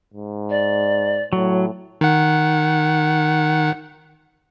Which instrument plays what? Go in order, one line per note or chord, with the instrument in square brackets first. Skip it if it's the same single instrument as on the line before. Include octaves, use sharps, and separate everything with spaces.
[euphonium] G#2
[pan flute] D5
[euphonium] A2 [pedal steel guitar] F#3
[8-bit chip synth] D#3 F#5